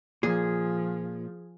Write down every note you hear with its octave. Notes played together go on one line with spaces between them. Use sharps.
A#2 F3 G#4